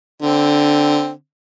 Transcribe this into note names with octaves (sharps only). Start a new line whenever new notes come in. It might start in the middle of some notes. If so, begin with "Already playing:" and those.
D3 C4